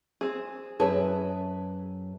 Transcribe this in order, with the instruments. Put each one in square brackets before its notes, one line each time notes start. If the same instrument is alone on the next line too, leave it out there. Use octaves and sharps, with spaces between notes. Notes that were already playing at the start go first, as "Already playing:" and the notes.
[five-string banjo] C4 G#4
[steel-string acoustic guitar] F#2 A5 [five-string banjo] G#4 B4